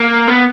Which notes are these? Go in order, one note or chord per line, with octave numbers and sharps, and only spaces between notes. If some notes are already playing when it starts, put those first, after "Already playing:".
Already playing: A#3
B3